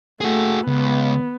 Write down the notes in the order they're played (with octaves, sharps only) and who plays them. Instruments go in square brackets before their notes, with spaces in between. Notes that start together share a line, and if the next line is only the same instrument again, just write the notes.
[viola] A3 [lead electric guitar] F#4 G#4
[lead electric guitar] C#2 [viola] B3